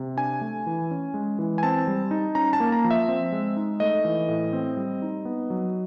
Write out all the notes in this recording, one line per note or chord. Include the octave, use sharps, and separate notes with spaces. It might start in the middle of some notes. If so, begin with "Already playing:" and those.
Already playing: C3
D4 G#5
A3
E3
C#4
G#3
E3
G#5
C4 A5
G3
D#4
C#4 A#5
A5
A#3
A#5
F3
E5
C4
G#3
D#4
A3 D#5
E3
A2
C4
G3
D#4
B3
F#3